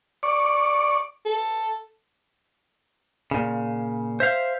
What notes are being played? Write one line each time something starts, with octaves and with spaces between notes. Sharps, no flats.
D5 C#6
A4
A#2 C#3
C5 E5 F5